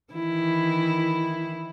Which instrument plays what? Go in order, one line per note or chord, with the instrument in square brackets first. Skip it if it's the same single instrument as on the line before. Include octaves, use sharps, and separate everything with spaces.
[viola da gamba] D#3 E3 E4